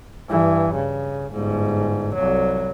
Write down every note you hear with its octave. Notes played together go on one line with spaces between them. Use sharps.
G2 E3
C#3
G1 G#2
C2 F#3